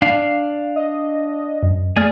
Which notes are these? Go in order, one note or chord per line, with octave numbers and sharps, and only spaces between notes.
D4 F5
D#5
F#2
A3 G#4 D5 F6